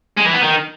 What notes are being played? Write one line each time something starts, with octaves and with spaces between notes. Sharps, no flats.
G#3
E3
B3
D#3